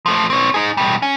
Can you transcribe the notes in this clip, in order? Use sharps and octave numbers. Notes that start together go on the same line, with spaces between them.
F3 A3
C4 C#5
D#4 G#4
B2 G3
C#4